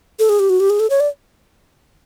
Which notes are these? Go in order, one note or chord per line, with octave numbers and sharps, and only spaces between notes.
A4
G#4
G4
F#4
G4
G#4
A4
C#5
D5